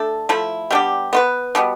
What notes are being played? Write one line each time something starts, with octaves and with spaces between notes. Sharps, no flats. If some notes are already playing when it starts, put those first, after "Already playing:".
Already playing: A3 D4 A4
F3 A3 E4
G3 B3 D4 G4
B3 F4 B4
B2 G3 B3